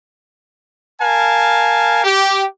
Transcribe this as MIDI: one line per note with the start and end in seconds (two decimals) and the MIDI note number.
1.00 2.03 70
1.00 2.03 77
1.00 2.03 80
1.00 2.03 81
2.04 2.44 67